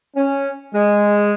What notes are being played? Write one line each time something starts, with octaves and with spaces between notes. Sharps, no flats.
C#4
G#3